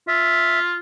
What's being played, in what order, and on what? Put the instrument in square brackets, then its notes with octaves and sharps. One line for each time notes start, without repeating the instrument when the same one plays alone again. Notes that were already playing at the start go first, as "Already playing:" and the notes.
[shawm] F4 [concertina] E5